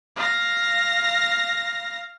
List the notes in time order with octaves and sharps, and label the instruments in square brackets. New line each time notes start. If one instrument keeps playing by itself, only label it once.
[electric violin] F5 A#6